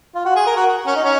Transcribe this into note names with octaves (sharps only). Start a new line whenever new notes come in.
F4
F#4
G#4
A#4
F#4
F#4
C#4
D#4
C#4